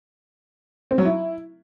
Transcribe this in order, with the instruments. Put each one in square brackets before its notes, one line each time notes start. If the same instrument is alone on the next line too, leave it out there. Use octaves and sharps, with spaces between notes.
[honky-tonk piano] C4
F#3
E4